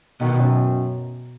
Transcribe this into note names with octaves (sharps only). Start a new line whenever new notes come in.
B2 D#3
F#2